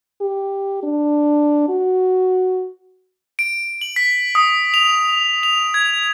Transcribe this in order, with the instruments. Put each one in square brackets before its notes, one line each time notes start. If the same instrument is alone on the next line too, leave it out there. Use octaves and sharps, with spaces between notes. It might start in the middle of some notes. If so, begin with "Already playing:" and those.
[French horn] G4
D4
F#4
[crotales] D7
F#7
B6
D#6
F7
F7
G#6